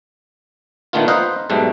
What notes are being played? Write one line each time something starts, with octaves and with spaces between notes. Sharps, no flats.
A#2 D3 D#3 A3 B3 F4
D#4 B4 C5 D#5 F5 F#5
B1 G#2 B2 G3 A3